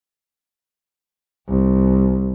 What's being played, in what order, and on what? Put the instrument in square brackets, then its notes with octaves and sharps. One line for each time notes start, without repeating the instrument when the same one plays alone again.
[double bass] C2